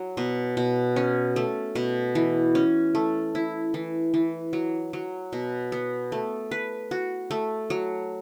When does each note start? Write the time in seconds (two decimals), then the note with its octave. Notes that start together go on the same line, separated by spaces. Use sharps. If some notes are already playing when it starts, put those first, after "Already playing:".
Already playing: F#3
0.17 B2
0.57 B2
0.96 C#4
1.36 A3
1.75 B2
2.15 E3
2.55 C#4
2.95 A3
3.35 E4
3.74 E3
4.14 E3
4.53 F#3
4.93 F#3
5.33 B2
5.72 B3
6.12 A3
6.51 B4
6.91 F#4
7.31 A3
7.70 F#3